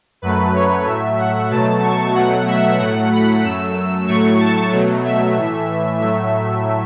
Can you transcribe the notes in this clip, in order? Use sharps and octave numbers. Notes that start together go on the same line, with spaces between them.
F#2 F#3 A3 B4
C#5
A2 F#3 A3 E5
F#5
B2 F#3 A3 A5
C#6
B2 F#3 A3 F#5
E5
A2 F#3 A3 F#5
B5
F#2 F#3 A3 E6
A2 F#3 A3 C#6
A5
B2 F#3 A3
E5
A2 E3 A3
A2 F#3 A3 E5